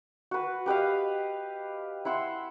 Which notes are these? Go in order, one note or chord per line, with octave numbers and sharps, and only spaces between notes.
F#4 B4
G4 B4 D#5 F5
E4 F#5 C6 E6